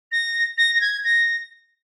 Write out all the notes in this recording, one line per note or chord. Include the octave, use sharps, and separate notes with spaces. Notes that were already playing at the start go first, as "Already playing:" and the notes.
A#6
A#6
A#6
G#6
A#6